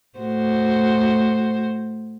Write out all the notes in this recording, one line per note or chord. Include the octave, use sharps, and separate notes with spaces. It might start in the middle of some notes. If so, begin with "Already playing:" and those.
A2 F#4 C5